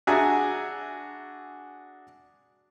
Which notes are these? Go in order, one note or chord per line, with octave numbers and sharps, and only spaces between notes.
D4 F#4 G#4 E5 G#5 A#5